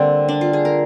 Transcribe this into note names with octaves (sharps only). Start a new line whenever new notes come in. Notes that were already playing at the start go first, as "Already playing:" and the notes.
Already playing: D3 G3 A#3 C4 D4
D4
F4
G#4
A#4